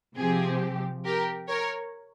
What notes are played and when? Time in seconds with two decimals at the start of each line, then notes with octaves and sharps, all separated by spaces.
0.16 C3 F3 C4 G4 G#4
1.05 G4 A#4
1.48 A#4 C#5